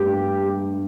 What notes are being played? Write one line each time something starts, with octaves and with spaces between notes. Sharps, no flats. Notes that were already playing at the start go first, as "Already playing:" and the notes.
Already playing: G2 G4